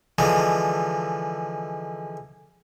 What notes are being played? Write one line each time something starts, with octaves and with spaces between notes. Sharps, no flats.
D3 E3 F3 G#3